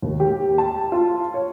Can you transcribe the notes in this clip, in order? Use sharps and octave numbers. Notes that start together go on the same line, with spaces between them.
D#2
G4
A5
F4
C#5